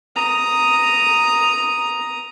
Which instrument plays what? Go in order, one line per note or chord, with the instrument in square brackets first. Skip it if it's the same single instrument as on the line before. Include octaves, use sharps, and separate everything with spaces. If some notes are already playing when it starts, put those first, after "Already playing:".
[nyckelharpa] A#5 D#6